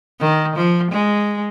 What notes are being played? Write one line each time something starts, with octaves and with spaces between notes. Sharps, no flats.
D#3
F3
G#3